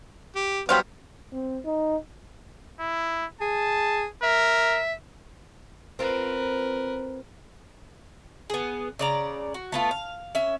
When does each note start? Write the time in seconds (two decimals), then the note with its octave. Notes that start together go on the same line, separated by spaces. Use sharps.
0.36 G4
0.69 F#3 G3 B3 G4 C5 F5
1.32 C4
1.65 D#4
2.80 E4
3.41 G#4 A5
4.23 A#4 E5
5.99 C4 F4 A#4 B4
8.50 B3 G#4
8.99 C#3 D5 A#5
9.54 F#4
9.72 A3 B3 F4
9.91 F5
10.35 C#4 E5